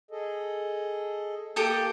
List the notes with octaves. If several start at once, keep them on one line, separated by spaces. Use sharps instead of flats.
G#4 A4 D#5
A#3 G4 A4 D#6